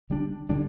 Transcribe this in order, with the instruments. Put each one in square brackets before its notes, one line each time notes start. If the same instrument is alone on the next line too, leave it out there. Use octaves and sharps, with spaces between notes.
[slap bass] D3 G3 D4
D3 G3 D4